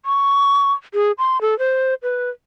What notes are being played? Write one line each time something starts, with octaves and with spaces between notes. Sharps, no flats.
C#6
G#4
C6
A4
C5
B4